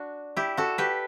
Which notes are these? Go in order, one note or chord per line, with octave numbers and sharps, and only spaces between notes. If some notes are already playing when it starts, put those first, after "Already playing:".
Already playing: D4 F#4
E4 G4
F#4 A4
G4 B4